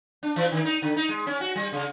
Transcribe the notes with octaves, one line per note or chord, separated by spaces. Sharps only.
D4
E3
D#3
D#4
D3
D#4
G#3
C#4
F#4
G3
C#3